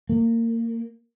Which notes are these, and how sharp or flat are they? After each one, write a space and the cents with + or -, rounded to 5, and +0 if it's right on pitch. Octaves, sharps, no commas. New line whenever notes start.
A#3 -25